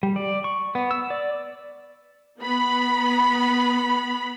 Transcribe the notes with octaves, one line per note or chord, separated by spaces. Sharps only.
G3
D5
C#6
B3
E6
D5
B3 B5